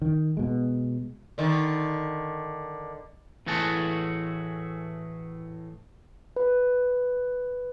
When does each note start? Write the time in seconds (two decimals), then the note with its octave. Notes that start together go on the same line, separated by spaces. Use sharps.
0.02 D#3
0.37 B2 G#3
1.38 D3 D#3
3.46 A2 E3 A3 F#4 G#4 A5
6.36 B4